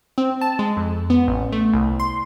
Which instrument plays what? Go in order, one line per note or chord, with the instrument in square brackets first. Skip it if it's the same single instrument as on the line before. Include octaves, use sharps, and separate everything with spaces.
[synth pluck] C4
A5
G#3
F2
B3
A1
A3
C2
C6